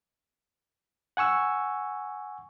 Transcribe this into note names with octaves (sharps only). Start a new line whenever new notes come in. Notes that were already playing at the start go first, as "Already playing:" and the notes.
F#5 G#5 C#6 E6